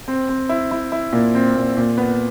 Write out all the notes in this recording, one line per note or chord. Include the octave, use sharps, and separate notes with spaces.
C4
C4
E4
E4
E4
A#2
C4
A#2
A#2
B3